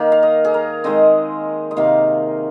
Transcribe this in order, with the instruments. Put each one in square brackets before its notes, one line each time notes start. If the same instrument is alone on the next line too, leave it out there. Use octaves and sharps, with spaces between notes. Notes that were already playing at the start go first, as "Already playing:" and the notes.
Already playing: [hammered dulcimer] D#3 A#3
F5
D#5
G#4
A#4
D#3 G#3 C4 D#5
D#5
C3 D#3 A#3 F5